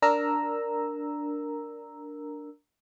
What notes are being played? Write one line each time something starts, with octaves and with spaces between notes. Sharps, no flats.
D4 A#4 A#5 E6